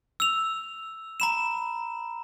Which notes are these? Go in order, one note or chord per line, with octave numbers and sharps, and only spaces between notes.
E6 F7
A#5 B5 E7